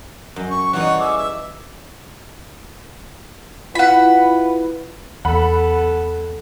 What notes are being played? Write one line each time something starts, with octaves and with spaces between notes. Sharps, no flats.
F#2
C#6
E3 G3 D#4 C#5 F#5
G#4 E5 D6
E5
E4 F4 B4 F#5 B5
E2 B3 A4 F#5 B5